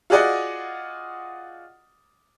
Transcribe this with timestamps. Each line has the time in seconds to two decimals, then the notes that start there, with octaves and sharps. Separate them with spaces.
0.10 F4 F#4 G#4 D5 D#5 F#5